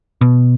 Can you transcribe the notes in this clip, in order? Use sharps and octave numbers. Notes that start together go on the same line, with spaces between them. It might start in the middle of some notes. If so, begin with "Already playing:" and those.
B2